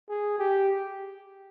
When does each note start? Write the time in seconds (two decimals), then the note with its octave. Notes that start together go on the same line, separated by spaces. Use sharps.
0.09 G#4
0.38 G4